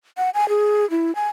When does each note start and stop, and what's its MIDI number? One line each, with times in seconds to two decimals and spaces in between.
0.18 0.30 78
0.34 0.48 80
0.49 0.89 68
0.90 1.14 64
1.15 1.29 80